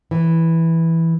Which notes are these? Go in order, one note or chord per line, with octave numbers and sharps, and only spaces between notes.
E3